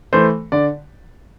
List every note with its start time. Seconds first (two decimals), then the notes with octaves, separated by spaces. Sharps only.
0.13 E3 A3 C5
0.52 D3 D5